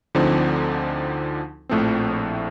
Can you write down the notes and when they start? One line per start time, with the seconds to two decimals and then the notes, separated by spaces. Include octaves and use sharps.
0.15 D2 D3 F3 C4 D#4
1.69 A#1 A2 F3 A3 C4